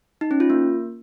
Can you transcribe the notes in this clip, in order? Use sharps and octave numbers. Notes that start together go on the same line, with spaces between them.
D#4
C#4
F4
A#3